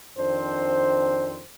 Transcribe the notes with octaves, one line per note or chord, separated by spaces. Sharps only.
F2 D#3 C4 D4 C5